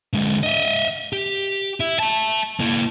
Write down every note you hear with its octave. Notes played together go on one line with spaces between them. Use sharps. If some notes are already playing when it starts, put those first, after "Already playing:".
D3 G#3
D#5 E5
G4
E4
E5 A5
A#3 E4